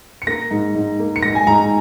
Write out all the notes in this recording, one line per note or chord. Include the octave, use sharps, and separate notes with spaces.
C#7
A#3 A#6
G#2
G#2
A#3
C#7
G#2 A#6
G#5
G#2 A#5